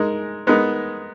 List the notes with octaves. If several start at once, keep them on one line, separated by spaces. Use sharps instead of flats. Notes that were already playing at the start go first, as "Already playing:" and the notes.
Already playing: G#3 D#4 A#4
G#3 B3 D#4 A#4